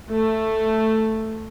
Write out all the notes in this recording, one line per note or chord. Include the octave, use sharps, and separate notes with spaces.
A3